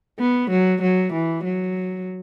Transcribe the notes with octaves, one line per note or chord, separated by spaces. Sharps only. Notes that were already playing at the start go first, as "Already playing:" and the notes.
B3
F#3
F#3
E3
F#3